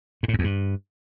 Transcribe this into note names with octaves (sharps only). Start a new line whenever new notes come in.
G#2
A2
F#2
E2
G2